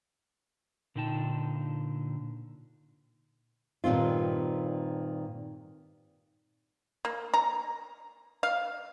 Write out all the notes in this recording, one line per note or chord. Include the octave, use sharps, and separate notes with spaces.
A#2 D3 D#4 G5 A5
G2 A#2 D#3 C4 F4
A#3
A#5
F5